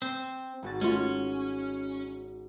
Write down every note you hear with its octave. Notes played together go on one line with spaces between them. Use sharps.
C4
G#1 F#4 A6
G#3 A3 C#4 F4